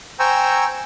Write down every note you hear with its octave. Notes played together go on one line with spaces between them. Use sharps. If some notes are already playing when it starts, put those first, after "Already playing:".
C5 G5 G#5 A#5 C#6 E6